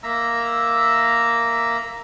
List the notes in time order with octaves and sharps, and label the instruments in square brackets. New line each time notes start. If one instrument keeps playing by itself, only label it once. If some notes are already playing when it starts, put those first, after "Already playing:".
[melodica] A#3 E5 A#5 E6